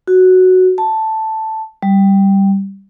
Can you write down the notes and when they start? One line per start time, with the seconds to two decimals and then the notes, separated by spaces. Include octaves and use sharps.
0.07 F#4
0.78 A5
1.83 G3